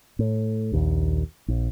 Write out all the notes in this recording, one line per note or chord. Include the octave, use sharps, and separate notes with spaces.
A2
A#1 D#2
A#1